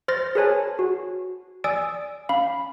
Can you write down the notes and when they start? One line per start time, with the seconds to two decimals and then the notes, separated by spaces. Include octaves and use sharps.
0.08 C5 C6 F6 A6 A#6
0.35 G#4 A#4 B4 C#5 G#5 A5
0.79 F#4
1.64 D5 G#5 D#6 E6 A6 D7
2.29 C#4 F5 B5